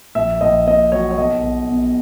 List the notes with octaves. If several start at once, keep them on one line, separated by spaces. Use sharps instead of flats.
A#1 E5
A#1 D#5
A#2 D#5
F#3 C#5
C#5
B1 D#5
B1
B2